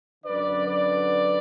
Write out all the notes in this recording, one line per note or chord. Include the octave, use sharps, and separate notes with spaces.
F#2 D3 B4 D5
B4 D5